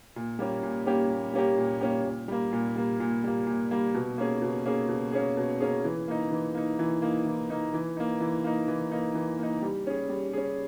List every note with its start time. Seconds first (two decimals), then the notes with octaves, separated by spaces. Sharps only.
0.16 A#2
0.39 G3 A#3 C#4 G4
0.63 A#2
0.86 G3 A#3 C#4 G4
1.10 A#2
1.33 G3 A#3 C#4 G4
1.58 A#2
1.81 G3 A#3 C#4 G4
2.04 A#2
2.28 G3 A#3
2.52 A#2
2.76 G3 A#3
3.00 A#2
3.24 G3 A#3
3.47 A#2
3.71 G3 A#3
3.94 B2
4.18 A#3 C#4 G#4
4.42 B2
4.66 A#3 C#4 G#4
4.88 B2
5.12 A#3 C#4 G#4
5.37 B2
5.60 A#3 C#4 G#4
5.84 E3
6.08 A#3 D#4
6.31 E3
6.55 A#3 D#4
6.79 E3
7.02 A#3 D#4
7.26 E3
7.50 A#3 D#4
7.74 E3
7.97 A#3 D#4
8.20 E3
8.44 A#3 D#4
8.68 E3
8.91 A#3 D#4
9.15 E3
9.39 A#3 D#4
9.62 G3
9.87 C#4 G#4
10.10 G3
10.33 C#4 G#4